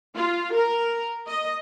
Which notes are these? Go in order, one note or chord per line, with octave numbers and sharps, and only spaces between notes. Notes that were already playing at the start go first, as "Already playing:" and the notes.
F4
A#4
D#5